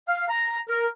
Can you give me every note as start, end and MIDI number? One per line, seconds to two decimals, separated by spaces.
0.08 0.29 77
0.30 0.59 82
0.69 0.87 70